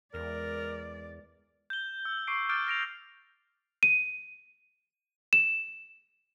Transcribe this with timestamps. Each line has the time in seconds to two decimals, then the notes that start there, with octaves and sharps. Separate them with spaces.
0.14 E2 G#3 A#4 D5
1.70 G6 G7
2.05 E6
2.27 C#6 D6 C7 D7
2.49 D6 F6 G6 A6 D7
2.67 F6 A#6 D7 F7
3.83 D#7
5.33 E7